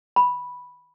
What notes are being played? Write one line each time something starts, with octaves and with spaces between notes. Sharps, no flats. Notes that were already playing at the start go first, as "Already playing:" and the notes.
B5